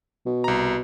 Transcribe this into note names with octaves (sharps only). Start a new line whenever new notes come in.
B2
C2 A#5